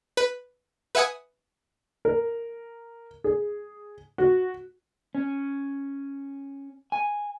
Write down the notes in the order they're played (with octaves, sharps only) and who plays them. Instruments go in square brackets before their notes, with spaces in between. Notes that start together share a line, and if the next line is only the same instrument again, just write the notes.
[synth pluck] B4
B4 E5 F#5 G#5 D#6
[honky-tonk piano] A#4
G#4
F#4
[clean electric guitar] C#4
G#5